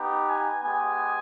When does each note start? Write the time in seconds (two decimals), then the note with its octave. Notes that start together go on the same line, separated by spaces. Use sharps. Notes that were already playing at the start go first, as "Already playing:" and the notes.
Already playing: B3 D#4 G4
0.28 G#5
0.64 G#3 B3 G4 G#5